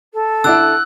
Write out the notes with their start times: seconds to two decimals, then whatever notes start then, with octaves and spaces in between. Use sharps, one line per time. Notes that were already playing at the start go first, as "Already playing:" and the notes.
0.13 A4
0.44 D3 D4 E4 E6 F#6